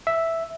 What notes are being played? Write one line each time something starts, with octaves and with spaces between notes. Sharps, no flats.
E5